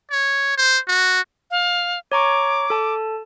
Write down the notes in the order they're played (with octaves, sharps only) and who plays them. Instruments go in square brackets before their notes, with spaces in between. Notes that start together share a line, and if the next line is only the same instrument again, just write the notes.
[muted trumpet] C#5
C5
F#4
[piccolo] F5
[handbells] C#5 A#5 C#6 [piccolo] D6
[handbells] A4 A5